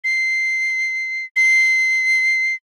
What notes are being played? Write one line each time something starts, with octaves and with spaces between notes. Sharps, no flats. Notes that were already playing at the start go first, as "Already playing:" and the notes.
C7
C7